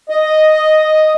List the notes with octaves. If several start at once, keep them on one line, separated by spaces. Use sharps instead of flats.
D#5